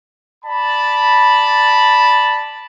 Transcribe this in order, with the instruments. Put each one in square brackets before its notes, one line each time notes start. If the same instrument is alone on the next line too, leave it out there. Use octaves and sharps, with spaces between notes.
[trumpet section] D5 A5 B5